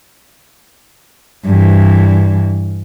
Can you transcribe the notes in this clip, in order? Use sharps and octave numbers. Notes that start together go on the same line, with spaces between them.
G2 E3